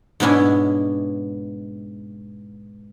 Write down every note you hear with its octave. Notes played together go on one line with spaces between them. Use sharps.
G#2 B2 B3 C#4 D4 E4